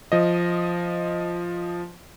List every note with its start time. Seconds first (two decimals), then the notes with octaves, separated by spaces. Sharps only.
0.12 F3 D#5